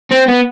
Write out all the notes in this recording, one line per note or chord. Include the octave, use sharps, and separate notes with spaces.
C4
B3